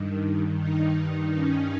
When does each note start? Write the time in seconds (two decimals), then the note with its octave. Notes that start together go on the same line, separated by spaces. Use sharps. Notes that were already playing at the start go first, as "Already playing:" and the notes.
Already playing: G2 D#3
0.58 D#4
0.96 D#4
1.35 C#4